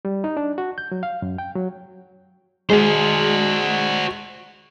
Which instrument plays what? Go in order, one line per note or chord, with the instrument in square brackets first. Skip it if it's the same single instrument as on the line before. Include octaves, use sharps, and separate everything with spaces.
[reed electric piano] G3
D#4
D4
F#4
G6
F#3
F5
F#2
G5
F#3
[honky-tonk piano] G#3 [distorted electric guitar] F#4 C5